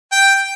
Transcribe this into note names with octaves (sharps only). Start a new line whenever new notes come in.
G5